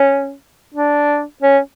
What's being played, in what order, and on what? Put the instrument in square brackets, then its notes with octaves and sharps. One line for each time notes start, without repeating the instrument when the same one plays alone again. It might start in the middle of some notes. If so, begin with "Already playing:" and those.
Already playing: [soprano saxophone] C#4
D4
C#4